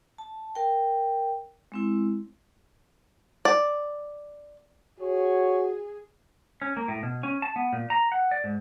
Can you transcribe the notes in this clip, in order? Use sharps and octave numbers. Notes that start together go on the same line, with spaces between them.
A5
A#4 G5
G#3 C4 E4
D5
F#4 G#4 C#5
C#4
A#3
A2
B2
C#4
A5
B3
A#2
A#5
F#5
D5
G#2